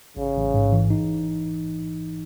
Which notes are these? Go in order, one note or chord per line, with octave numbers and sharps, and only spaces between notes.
A1 C#3
A1
G#2
E3
D#4